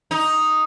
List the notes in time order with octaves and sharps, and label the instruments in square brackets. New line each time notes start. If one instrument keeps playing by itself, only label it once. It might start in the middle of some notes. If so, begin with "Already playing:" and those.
[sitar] D#4